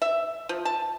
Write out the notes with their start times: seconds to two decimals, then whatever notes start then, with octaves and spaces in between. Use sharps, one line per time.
0.02 E5
0.49 F3
0.65 A5